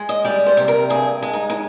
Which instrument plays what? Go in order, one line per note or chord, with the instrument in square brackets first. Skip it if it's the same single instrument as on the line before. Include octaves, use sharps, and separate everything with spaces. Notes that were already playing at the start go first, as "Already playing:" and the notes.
Already playing: [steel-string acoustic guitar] G#3
D#5
G3 D5
C5
C3
A#4
G2 G#4
G#3
D#4
D#4